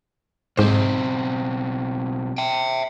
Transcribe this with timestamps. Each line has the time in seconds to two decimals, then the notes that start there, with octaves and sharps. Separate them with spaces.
0.57 B1 G#2 C4 C5
2.38 E5 G5